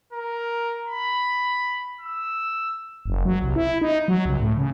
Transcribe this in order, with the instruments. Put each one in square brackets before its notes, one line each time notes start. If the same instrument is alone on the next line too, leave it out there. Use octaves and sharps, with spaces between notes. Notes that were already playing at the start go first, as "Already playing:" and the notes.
[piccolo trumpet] A#4
B5
E6
[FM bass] F#1
F#3
C2
E4
D#4
F#3
C#2
A2
C#3